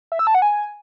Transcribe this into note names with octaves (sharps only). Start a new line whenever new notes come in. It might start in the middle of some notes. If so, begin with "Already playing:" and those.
E5
E6
A5
F#5
G#5